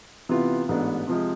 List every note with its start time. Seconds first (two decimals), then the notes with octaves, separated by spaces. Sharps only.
0.29 C3 E3 B3 F4
0.69 A1 G#2 E3 B3 D4
1.07 C3 F3 G#3